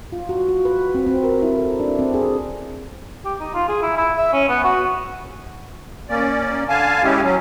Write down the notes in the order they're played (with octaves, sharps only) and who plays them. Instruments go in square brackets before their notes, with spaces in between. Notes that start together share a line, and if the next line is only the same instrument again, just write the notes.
[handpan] F4
F#4
F#4
B4
C4
C4
A#4
E4
A4
D4
C4
G#4
[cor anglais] G4
D#4
F4
G#4
E4
E4
E5
C#4
B3
F#4
[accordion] A#3 C#4 D5
D3 F5 G#5 A5
G3 G#3 C#4 E4 G4
F#3 C#4